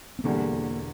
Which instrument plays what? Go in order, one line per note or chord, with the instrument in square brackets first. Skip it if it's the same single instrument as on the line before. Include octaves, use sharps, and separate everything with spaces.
[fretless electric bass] C4
[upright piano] E1 E2 D3 G3 [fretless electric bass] A#3